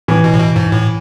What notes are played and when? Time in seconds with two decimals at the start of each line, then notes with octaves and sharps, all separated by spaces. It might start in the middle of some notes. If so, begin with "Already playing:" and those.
0.08 A2 E3
0.24 B2
0.34 A2
0.39 B2
0.56 G#2
0.72 A2